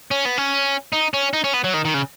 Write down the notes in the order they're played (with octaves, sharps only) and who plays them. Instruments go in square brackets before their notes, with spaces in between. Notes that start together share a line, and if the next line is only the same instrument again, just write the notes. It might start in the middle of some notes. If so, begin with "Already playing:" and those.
[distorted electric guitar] C#4
B3
C#4
D#4
C#4
D#4
C#4
B3
F#3
D#3
D#3
C#3